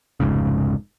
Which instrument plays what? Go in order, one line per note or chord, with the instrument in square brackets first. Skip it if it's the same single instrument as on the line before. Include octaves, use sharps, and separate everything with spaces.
[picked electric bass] F1 C#2 G#2 C#3